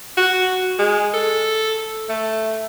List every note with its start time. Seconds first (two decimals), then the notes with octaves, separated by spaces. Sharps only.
0.17 F#4
0.79 G#3
1.14 A4
2.09 A3